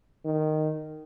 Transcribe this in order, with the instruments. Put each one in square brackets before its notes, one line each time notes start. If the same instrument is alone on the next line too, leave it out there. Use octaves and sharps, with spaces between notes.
[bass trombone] D#3